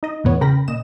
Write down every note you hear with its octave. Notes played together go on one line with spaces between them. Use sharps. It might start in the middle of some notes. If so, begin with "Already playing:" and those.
D#4 D#5
E2 A2 B3 C#5
C#3 A#4 G5 B5 A#6
A#2 D#5 E7